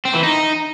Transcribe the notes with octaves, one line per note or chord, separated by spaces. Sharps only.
C4
E3
D#4